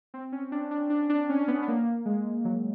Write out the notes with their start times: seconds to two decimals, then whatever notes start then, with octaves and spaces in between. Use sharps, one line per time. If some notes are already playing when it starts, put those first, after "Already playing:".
0.14 C4
0.32 C#4
0.52 D4
0.71 D4
0.90 D4
1.10 D4
1.29 C#4
1.48 B3
1.63 B3
1.68 A#3
2.06 G#3
2.45 F#3